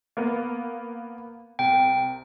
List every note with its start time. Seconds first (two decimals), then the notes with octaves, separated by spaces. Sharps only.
0.17 A#3 B3
1.59 C2 G5